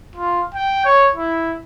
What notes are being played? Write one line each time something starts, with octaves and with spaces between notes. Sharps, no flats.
F4
G5
C#5
E4